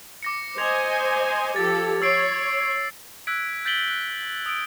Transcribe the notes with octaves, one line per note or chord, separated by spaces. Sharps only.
D6 A#6 C#7
C5 D#5 G#5 G#6 A#6 F7
F3 G4 A4 A6
C#5 E6 C7 D7
E6 F#6 G#6 B6 D7
G6 A6 B6 D7 F#7 G7
F#6
D#6 E6 D7